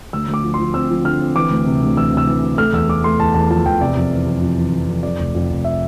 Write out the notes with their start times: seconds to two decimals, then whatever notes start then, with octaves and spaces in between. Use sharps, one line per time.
0.13 D2 E6
0.28 D2
0.34 D6
0.44 F3
0.54 C6
0.59 F3
0.74 C4 E6
0.90 F3
1.04 D3 F6
1.21 C4
1.36 E3 D6
1.51 D2
1.66 C3
1.82 D2
1.97 E3 E6
2.13 C3 E6
2.27 E3
2.44 C3
2.58 A3 F6
2.73 E2 E6
2.88 A3 D6
3.04 A3 C6
3.19 E2 A5
3.34 E2 A5
3.50 F3 A5
3.66 E2 G5
3.81 C3 D5
3.97 F2
4.12 E3
4.27 F2
4.42 F2
4.58 E3
4.73 F2
4.88 F2
5.03 F2 D5
5.18 F1
5.35 F2
5.50 F1
5.64 E5